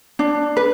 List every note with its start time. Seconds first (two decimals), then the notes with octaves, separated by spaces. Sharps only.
0.19 D4
0.57 B4